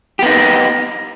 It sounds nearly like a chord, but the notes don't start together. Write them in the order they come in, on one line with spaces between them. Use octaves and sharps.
G4 B3 D#4